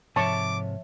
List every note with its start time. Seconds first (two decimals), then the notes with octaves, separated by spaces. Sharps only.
0.16 G#2 C3 F3 C#5 E5 A5 C#6 D6